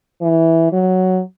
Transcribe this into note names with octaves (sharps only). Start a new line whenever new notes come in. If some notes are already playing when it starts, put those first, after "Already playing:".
E3
F#3